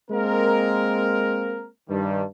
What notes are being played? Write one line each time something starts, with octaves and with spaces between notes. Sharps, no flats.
G#3 A#3 C4 A#4
G2 D#3 G3